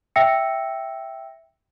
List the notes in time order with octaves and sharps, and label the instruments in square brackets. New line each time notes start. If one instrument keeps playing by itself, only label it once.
[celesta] E5 G5 E6 A#6 C#7